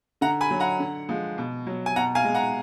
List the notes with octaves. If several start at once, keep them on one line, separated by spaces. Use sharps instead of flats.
D3 F#5 A#5
G#5 B5
F#3
F#5 A#5
D3
F3 G#3
B2
F#3
G#5
B2 F#5 A#5
F5 G#5
G#3
F#5 A#5